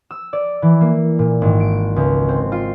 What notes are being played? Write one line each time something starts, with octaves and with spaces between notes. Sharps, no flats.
E6
D5
E3
A#3
A#2
G#1
D7
C#2
C4
F4